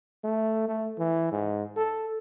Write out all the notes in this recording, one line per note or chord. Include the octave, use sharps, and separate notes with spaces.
A3
A3
E3
G#2
A4